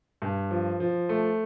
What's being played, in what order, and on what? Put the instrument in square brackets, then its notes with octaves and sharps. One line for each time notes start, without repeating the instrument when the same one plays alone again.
[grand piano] G2
F3
F3
A3